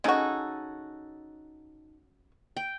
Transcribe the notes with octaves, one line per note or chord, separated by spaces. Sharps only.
C#3 D#4 F#4 A4 G#5
G5